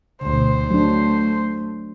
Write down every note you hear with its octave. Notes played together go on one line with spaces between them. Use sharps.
D2 B2 C5
F#3 A3 D4